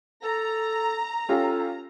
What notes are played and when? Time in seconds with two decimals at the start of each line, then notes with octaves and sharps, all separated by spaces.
0.24 A4 A#5
1.29 C#4 F4 G4 A4